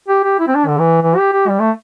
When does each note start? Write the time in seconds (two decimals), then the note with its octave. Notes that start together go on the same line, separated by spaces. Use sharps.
0.08 G4
0.24 G4
0.39 E4
0.48 C4
0.55 D4
0.67 D3
0.78 E3
1.02 E3
1.17 G4
1.33 G4
1.48 G3
1.60 A3